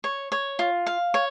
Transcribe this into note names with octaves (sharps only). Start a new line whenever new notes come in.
C#5
C#5
F4
F5
C#5